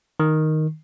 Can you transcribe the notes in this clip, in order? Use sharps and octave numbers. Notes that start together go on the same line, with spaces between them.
D#3